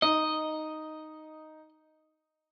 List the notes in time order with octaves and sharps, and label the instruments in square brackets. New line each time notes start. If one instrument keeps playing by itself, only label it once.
[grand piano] D#4 [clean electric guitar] D#5